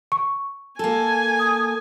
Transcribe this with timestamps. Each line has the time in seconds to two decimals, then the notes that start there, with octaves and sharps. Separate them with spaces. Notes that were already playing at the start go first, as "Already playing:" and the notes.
0.12 C#6
0.79 A#3 A4 G#5 A5
1.39 D#6